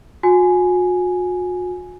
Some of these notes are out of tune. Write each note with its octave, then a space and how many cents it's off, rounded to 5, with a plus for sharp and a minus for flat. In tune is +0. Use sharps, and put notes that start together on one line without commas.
F#4 -45 G#5 +5